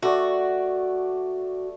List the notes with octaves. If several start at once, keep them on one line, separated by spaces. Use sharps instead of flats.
A3 F#4 D5